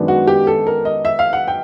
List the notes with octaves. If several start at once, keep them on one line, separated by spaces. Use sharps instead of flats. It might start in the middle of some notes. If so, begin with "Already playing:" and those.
Already playing: F#2 D#3 G#3 B3 D4
F#4
G4
A4
A#4
D#5
E5
F5
F#5
G5